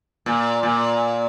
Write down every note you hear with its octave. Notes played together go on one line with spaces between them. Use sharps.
A#2
A#2